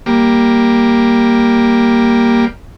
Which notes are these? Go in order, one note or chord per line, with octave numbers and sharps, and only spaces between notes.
G3 A#3